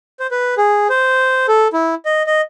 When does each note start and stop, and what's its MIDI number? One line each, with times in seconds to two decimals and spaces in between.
0.20 0.27 72
0.31 0.55 71
0.58 0.88 68
0.90 1.46 72
1.48 1.68 69
1.73 1.95 64
2.05 2.23 75
2.26 2.41 75